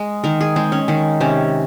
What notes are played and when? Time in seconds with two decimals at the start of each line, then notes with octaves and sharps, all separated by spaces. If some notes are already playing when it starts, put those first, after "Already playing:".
Already playing: G#3 G#4
0.24 D#3 A#4
0.41 G#4
0.56 G#3 C4
0.72 C#4
0.88 D#3 C#4
1.21 C3 C#4